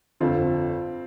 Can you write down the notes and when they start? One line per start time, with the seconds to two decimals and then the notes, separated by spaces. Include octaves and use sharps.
0.20 G1 F2 D3 F3 C4 F4